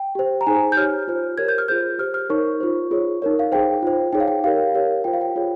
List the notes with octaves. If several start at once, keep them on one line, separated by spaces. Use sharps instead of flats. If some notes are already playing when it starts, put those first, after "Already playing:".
Already playing: G5
G4 C5
A#5
D#4 G#4 C5 G#5
G6
G4 C#5 F6
F4 C5
G4 A#4 C#5 G#6
G6
F6
F4 G#4 C5 G6
G4 C5 F6
F6
D#4 A#4 C#5 C#6
F4 C5
F4 G#4 C#5
D#4 A#4 C#5
F5
D#4 G#4 C5 G5
F4 C5
D#4 G#4 C#5 G5
F5
G5
G4 A#4 C#5 F5
G4 A#4 C#5
F4 C5 G5
F5
G5
F4 G#4 C#5